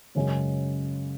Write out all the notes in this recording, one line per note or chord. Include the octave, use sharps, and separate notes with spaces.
F#2 C#3 G#3 C#4